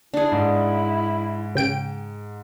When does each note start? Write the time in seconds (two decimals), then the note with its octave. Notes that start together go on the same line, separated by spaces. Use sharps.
0.14 D4 E4 G#4
0.32 G#2
1.55 C#3 G5 D7